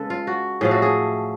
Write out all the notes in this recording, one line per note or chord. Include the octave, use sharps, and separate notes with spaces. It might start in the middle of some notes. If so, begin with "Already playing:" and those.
Already playing: C#3 G#3 A4 B4
F4
F#4
A2 F3 A3 G#4
F#4
G#4